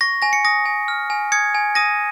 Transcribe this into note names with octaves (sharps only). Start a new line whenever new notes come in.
C#6 A#6
G#5 A#6
C#7
D#6 A#6
G#5
F6
G#5
D#6 G#6 C#7
G#5
D#6 A#6 D#7